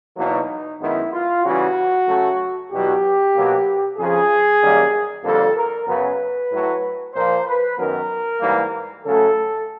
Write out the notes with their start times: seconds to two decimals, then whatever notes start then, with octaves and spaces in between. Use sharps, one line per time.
0.17 E2 B2 F#3 A#3 D#4
0.80 F#2 D#3 G#3 B3 E4
1.12 F4
1.43 C#3 E3 G3 F#4
2.06 C#3 F#3 A3
2.70 E2 B2 F#3 G4
3.33 B2 F#3 A#3
3.97 F2 C#3 F3 G#4
4.60 F#2 D#3 G3 A#3
5.23 F2 D3 G3 A#3 A4
5.55 A#4
5.87 F#2 C#3 F#3 B3 B4
6.51 A2 F#3 A3
7.13 A#2 F3 A#3 C5
7.46 B4
7.77 F#2 D#3 F#3 B3 A#4
8.40 G#2 E3 G3 A#3
9.04 C#3 F#3 A3 A4